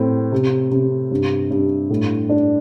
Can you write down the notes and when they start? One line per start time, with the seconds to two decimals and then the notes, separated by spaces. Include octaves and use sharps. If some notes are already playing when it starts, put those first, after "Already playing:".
Already playing: A2 C4
0.32 C3
0.71 C3
1.11 G2
1.51 G2
1.90 A2
2.29 D4